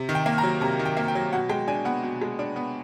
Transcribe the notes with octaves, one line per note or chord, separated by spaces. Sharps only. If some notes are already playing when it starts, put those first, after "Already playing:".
Already playing: C3
D#3
G5
A#3
A#5
F#3
C3 A#5
D#3
G5
A#3
G5
F#3
B2 F#5
G#3 G5
D4 G#5
B3 F#5
B2
G#3
D4
B3